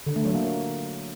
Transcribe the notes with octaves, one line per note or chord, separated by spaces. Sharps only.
D3
A3
F#3
A#3